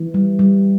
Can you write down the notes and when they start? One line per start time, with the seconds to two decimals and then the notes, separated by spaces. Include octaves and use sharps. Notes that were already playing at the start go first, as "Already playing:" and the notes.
Already playing: E3
0.14 G3
0.39 G3